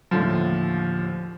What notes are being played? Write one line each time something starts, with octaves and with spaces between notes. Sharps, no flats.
D#2 A2 D3 F3